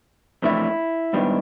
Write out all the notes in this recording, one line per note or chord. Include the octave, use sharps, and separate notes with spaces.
F2 C3 E3 A3 D4 E4
G#2 D#3 G3 B3 D4